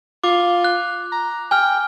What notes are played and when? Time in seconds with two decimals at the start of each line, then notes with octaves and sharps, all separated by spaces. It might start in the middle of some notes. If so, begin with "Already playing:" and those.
0.24 F4 D6
0.64 F#6
1.12 A#5
1.51 G5 G#5 F6